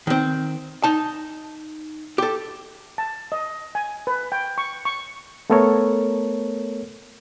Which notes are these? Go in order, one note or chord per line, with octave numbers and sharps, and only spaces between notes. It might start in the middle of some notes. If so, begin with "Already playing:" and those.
D#3 C4
D#4 A5
G4 A4
A5
D#5
G#5
B4
G5
C#6
C#6
A3 B3 A4 A#4 C#5